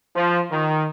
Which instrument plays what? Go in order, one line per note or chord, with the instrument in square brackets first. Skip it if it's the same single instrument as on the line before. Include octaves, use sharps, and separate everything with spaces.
[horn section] F3
D#3